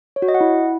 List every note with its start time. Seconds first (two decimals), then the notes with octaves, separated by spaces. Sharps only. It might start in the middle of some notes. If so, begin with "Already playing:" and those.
0.16 C#5
0.22 F#4
0.28 D#5
0.34 F#5
0.41 E4